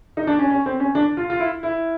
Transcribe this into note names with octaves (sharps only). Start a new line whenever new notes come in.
D#4
D4
C#4
C#4
C4
C#4
D4
F4
F4
E4
E4